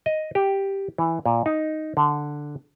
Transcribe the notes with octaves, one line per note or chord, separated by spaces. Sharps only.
D#5
G4
E3
A#2
D#4
D3